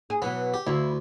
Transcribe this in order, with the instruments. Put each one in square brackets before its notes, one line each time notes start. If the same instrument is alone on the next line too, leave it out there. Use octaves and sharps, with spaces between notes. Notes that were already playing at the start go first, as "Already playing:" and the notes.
[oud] G#4
[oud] B2 E3 F#3 [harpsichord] B3
[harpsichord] G4
[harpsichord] D2 [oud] E4 F5